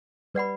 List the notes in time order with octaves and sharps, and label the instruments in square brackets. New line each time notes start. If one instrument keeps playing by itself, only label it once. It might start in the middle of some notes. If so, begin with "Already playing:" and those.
[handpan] G3 [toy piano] B4 D5 F#5 B5